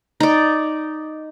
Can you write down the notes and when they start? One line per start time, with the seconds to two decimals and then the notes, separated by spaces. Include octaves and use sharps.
0.20 D#4 D5